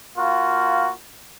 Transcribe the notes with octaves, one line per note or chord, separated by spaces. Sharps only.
A#3 F4 F#4